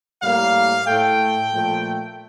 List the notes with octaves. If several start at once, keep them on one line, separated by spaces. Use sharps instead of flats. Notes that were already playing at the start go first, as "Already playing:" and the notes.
A2 G3 A#3 F5
A2 A3 G5
A#2 F3 A3